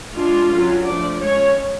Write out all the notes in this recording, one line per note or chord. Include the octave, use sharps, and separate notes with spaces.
G#3 D4 F4
D3 F#3 C#4
F3 A3 D4 D5
G#3 C#4 C#5